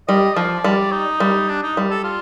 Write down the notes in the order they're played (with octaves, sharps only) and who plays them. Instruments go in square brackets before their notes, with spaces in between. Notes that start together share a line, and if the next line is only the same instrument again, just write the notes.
[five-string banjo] G3 [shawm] D#5
[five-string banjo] F3 [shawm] D5
[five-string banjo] G3
[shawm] D#4
[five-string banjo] G3
[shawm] D4
D#4
[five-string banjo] G3
[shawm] A4
F4